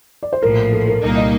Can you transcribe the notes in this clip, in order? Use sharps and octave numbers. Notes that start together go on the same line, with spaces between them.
D5
C5
A#1 A2 F3 A#4
A4
A#4
C2 A#2 G3 A#3 D#4
D#5